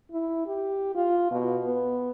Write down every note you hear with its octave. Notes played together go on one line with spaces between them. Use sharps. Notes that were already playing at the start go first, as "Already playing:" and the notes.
E4
G4
F4
B2
B3